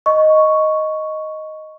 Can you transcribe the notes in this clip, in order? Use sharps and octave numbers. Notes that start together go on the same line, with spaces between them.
D#5 C#6